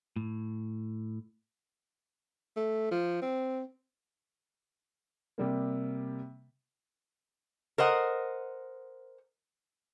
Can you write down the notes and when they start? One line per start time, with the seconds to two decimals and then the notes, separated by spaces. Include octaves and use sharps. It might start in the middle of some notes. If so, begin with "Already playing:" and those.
0.16 A2
2.56 A3
2.91 F3
3.22 C4
5.38 C3 G3 A#3
7.78 A#4 C5 D#5 F#5